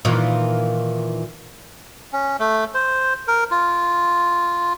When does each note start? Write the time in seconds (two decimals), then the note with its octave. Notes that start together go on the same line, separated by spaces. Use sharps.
0.05 A#2 D#3 E3
2.13 C#4
2.39 A3
2.74 C5
3.28 A#4
3.51 F4